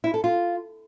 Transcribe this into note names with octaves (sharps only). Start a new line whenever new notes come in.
E4
A4
F4